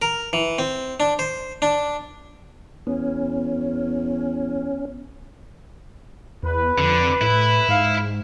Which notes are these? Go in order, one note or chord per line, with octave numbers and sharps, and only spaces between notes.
A#4
E3
C4
D4
C5
D4
E2 B3 C#4
E2 B4
F2 D3
A2 E4
G#2 F5